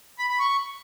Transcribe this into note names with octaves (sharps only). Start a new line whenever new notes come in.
B5
B5
C#6